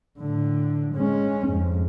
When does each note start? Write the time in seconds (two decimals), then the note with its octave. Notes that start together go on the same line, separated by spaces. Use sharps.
0.19 A2 D3
0.95 G#3 C#4
1.46 F2 G#2